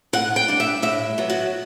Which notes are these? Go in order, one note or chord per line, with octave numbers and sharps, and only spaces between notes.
A2 F#5
G5
G3 D4
E5
A2 E5
F#3 B3
F#4